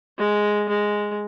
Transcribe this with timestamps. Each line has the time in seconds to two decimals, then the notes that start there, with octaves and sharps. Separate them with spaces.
0.18 G#3
0.69 G#3